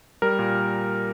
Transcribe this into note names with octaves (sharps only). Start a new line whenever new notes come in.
G3 A#4
A#2